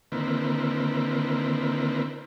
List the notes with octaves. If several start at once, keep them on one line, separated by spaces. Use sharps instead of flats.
D3 D#3 A#3 C4 E4 B4